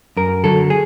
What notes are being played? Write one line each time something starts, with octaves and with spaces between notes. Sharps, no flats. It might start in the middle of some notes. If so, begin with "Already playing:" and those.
F#2 A#4
D3 F#3 A4
G#4